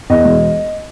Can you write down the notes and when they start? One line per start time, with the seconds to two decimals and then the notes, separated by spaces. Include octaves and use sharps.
0.10 E2 D#5
0.25 E1